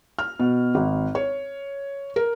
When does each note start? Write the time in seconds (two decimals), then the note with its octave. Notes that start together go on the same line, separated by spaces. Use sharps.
0.19 F6
0.40 B2
0.75 G#1
1.15 C#5
2.16 A#4